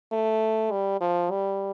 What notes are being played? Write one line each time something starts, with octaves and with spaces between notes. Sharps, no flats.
A3
G3
F3
G3